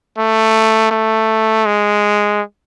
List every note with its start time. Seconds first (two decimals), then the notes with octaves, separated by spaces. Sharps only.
0.18 A3
0.91 A3
1.66 G#3